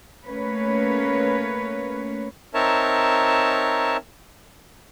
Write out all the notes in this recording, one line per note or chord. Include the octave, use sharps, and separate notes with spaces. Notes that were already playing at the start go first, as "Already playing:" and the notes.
A3 A#3 C#4 B4 C#5
C4 D#4 A#4 C#5 E5 A5